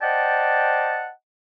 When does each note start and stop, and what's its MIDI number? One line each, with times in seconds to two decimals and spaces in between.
0.02 1.09 72
0.02 1.09 74
0.02 1.09 75
0.02 1.09 78
0.02 1.09 79
0.02 1.09 81